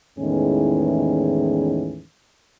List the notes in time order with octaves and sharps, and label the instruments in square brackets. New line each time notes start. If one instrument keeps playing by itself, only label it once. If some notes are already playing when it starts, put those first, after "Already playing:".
[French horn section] E2 A2 D#3 E3 G#3 C#4